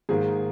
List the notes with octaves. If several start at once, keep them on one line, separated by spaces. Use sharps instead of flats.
G#2 D#3 A#3 G#4